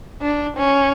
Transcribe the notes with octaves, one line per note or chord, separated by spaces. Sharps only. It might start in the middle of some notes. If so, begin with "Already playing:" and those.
D4
C#4